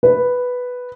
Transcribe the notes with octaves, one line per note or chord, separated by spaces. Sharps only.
B4